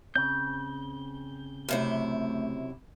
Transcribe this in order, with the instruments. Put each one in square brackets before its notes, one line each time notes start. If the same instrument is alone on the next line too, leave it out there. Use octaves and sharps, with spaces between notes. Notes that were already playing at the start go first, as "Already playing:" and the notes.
[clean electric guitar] C#3 C4 [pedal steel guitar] G6
[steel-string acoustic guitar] F#2 C3 E4 [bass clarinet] A3